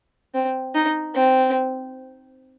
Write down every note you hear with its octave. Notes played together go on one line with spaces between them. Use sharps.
C4
D#4
C4